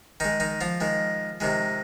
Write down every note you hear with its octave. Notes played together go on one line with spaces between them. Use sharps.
D#3 G#3 D#4
D#3 D#4
F3 F4
D#3 G#3
C3 D#3 G#3